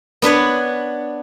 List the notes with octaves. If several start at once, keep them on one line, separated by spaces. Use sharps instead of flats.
B3 D4 B4 C#5